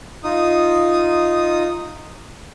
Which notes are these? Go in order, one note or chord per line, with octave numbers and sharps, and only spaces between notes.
D#4 F4 D#6